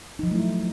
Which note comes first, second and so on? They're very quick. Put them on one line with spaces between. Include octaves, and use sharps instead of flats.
D#4 F3 F#3 A3 E4